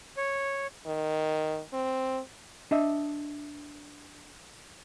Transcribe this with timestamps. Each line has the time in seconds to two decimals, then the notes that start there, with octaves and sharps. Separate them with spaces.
0.17 C#5
0.87 D#3
1.73 C4
2.71 D4 D#5 E5